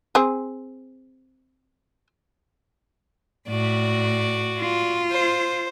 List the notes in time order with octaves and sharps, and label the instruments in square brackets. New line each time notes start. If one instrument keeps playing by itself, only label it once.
[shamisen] C4 G#4
[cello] A2 [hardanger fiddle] F#4 D5
[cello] F4
[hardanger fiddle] C5